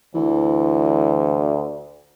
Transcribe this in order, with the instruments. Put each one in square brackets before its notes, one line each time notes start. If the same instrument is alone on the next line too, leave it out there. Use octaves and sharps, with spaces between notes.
[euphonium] D2 [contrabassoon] E3